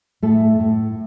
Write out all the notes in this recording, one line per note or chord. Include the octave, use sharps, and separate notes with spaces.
A2 A3 A4
A2